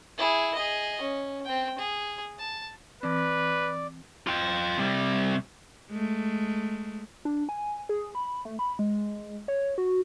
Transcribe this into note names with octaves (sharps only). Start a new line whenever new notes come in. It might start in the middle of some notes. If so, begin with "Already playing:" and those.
E4 G#4
G#4 D#5
C#4
C4 G5
G#4
A5
E3 C4 B4 D5
F4 G5
C3 G3
G#3 A3
D4
G#5
G#4
B5
A3
B5
G#3
C#5
F#4